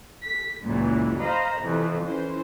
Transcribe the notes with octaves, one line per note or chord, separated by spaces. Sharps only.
B6
C#2 F#2 A#2 E3 F#3
C5 D#5 F5 A#5 B5
F2 C3 E3
E3 C#4 C5